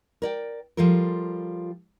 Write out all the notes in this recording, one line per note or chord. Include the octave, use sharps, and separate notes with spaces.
A#4 D5 G5
F3 G3 F4 A4 A#4